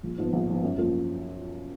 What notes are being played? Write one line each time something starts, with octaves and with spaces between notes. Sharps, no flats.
A#1
G#2 F3 B3
A#1
G#2 F3 B3
F#2
F3 A#3 F4